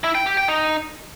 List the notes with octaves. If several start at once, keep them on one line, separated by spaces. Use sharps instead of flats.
E4
G5
G4
G5
D#4